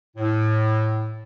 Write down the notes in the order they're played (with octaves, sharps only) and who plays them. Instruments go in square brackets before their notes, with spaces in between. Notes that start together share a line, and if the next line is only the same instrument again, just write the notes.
[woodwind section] A2